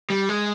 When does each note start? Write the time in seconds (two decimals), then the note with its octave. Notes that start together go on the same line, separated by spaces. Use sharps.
0.10 G3
0.29 G#3